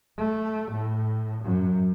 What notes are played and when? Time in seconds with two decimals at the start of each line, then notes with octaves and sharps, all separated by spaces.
0.17 A3
0.71 A2
1.44 F#2